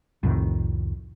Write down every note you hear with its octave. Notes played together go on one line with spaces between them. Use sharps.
C2 F2 A2 D#3